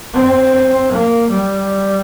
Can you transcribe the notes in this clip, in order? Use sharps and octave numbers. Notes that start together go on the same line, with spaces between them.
C4
A#3
G3